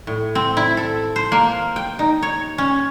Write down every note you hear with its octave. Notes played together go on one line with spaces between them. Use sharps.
A2
C4
E4
A4
C5
A#3
G5
D#4
C#5
C#4